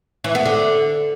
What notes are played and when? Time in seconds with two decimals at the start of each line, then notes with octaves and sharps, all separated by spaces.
0.24 E3
0.35 B3
0.45 D3